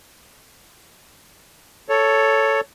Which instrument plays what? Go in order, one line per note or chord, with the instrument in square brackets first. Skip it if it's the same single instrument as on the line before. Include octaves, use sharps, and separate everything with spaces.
[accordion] A4 C#5